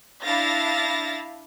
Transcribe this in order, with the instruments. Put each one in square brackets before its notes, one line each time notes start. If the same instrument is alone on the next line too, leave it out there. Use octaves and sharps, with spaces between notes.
[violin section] D4 E4 F5 A6 A#6